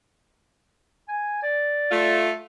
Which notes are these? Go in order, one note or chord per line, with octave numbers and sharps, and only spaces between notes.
G#5
D5
A3 F4